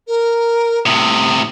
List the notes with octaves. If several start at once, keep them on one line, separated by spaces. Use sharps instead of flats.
A#4
A2 C3 D#6